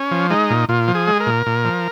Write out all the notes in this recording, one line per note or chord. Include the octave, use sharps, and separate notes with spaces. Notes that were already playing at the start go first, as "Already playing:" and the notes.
Already playing: C#4
F3
G#3 D#4
A#2
A#2 F4
F3
G#4
G#3
A#4
A#2
A#2
F3